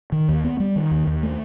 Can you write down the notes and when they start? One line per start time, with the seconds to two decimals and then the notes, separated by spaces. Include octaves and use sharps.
0.12 D#3
0.28 D#2
0.44 B3
0.60 G3
0.76 D#3
0.91 D#2
1.07 D#2
1.23 A3